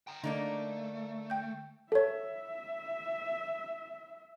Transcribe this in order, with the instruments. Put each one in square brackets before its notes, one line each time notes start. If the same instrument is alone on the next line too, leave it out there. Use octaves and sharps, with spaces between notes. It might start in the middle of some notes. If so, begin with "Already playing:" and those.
[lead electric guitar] G5 A#5
[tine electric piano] D3 [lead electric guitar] A3 [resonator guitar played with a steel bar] A#3 D4 D#4
[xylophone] G5 G6
[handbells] A4 C#5 [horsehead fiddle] E5